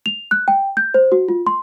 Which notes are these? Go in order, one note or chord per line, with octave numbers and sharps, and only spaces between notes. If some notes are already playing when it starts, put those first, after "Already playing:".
F7
F#6
G5
G6
C5
F#4
F4
C6